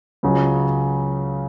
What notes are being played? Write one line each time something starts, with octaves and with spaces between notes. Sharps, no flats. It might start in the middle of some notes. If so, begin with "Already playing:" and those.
C#2 C#3 F#3